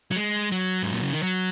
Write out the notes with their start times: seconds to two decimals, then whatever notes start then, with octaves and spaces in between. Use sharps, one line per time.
0.11 F#3
0.16 G#3
0.52 F#3
0.83 G#2
0.93 A#2
1.03 C#3
1.13 D#3
1.23 F#3